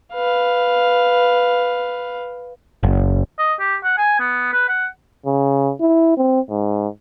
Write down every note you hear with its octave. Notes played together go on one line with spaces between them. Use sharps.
B4 F5
F#1
D#5
G4
F#5
G#5
B3
B4
F#5
C#3
E4
C4
G#2